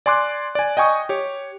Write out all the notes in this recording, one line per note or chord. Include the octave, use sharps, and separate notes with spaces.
D5 G#5 C6 D6 F#6
D5 G#5
D#5 G5 G#5 C#6 D#6
G4 C#5